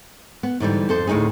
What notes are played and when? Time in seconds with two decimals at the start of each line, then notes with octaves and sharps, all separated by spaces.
0.43 B3
0.60 G#2 D3 E3 G3
0.89 F2 A4 C5
1.07 D2 A2 C#3 D#4 G#4